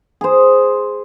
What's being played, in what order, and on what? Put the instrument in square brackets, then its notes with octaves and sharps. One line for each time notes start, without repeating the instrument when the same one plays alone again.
[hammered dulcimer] G#4 C5